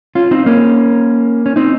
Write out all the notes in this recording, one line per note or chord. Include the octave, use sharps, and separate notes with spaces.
C#4 F4
C4 D#4
A#3 C#4
C#4
C4 D#4